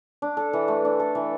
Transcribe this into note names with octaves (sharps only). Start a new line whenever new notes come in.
D4
A4
E3
A3
D4
A4
E3